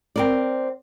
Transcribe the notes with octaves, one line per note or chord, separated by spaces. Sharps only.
C4 A#4 D5